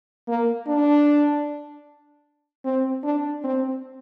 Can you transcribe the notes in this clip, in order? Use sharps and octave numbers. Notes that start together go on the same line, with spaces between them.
A#3
D4
C4
D4
C4